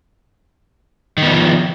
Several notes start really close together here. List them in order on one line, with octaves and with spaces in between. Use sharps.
D#3 B3 F3